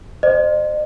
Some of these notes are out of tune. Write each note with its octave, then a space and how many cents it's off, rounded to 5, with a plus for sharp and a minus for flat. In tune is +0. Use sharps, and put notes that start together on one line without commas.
C5 +0 D#5 -45